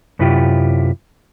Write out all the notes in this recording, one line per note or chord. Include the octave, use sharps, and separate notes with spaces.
F#2 C3 E4 F4 G4